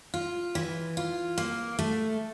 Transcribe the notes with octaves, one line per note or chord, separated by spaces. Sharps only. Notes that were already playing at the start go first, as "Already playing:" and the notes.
F4
E3
F4
A#3
A3